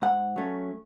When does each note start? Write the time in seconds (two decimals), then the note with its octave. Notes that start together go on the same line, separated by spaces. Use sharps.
0.02 G#2 F#5
0.36 F#3 A3 C#4